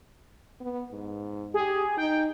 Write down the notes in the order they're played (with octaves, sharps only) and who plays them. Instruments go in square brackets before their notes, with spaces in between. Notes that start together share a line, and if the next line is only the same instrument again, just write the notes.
[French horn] B3
G#2
[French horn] G4 [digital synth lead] G#4
[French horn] D#4 [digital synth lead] G5